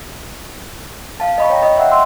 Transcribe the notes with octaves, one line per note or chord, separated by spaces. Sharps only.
F5 A5
D#5 B5 C#6
C#5 G5 A#5
D#5
D#5 E5 F#5 G5
C6 E6